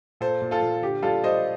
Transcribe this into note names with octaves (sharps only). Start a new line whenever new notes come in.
A#2 A4 C5
A#2
F4 A4
A#2
D3 G4
G3 F4 A4
G3 C5 D#5